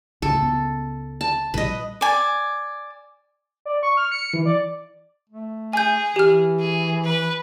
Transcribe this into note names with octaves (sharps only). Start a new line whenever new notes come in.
C#2 A2 A4
C#2 B3
A5
A#1 A#2 G3 B4 D#5
D5 G#5
D5
C#6
F6
C#7
E3
D5
A3
G#4 G#5 G6
E3 G4 F6
G#4
B4